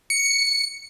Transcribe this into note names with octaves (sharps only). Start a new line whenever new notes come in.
C#7